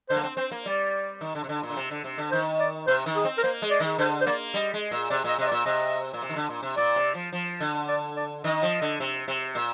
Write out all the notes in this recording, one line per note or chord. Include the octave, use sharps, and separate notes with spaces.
D3 C5
A#3
C4
C4 C5
A#3
G3 D5
D#3
D3
C3
D3
A#2
D3
C3
D3
C3
D3
D#3 C5
D5
C3 C5
D#3
G#4
C4
A#4
A#3 C5
G#3
D5
D#3
D3 C5
C5
A#3 D5
G3 D#5
G#3
A#2
C3 D5
A#2 D#5
C3 D#5
D5
A#2
C3 D#5
A#2
C3
D#3
D3
A#2
C3
A#2 D5
C3
F3
F3
D3
D5
D5
D#3 D#5
F3
D3
C3
C3
A#2